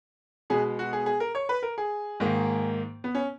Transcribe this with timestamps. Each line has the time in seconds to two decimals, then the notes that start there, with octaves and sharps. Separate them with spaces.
0.50 B2 G#3 B3 G#4
0.79 F#4
0.93 G#4
1.06 G#4
1.20 A#4
1.35 C#5
1.49 B4
1.63 A#4
1.78 G#4
2.20 G#2 D#3 A#3
3.04 B3
3.15 C#4